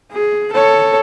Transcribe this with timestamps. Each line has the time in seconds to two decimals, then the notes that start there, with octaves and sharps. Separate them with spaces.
0.12 G#4
0.53 A4 C#5